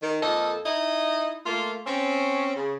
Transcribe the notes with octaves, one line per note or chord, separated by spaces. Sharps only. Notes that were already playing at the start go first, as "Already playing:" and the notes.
D#3
F2 A#3 A4 D#5
D#4 E4 D#5
A3 A#3 F4
C4 C#4
C#3